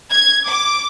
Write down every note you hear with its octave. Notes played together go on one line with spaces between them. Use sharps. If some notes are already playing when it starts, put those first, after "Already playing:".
G#6
D6